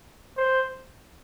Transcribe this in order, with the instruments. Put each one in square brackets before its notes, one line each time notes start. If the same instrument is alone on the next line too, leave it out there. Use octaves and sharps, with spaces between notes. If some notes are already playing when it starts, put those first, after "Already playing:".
[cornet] C5